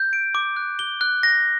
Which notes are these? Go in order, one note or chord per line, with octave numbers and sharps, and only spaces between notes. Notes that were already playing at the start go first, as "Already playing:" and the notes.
Already playing: G6
D7
D6
F#6
G7
F#6
A#6